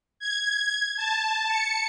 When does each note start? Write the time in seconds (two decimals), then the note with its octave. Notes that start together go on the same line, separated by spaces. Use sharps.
0.19 G#6
0.97 A5
1.48 C#7